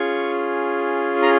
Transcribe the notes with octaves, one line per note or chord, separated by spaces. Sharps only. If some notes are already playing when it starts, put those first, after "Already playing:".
Already playing: C#4 F4 G#4 C#6
A#5